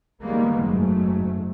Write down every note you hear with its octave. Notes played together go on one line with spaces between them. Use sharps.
D#3 G3 G#3 A#3 B3
F#1 G#2 F#3 A3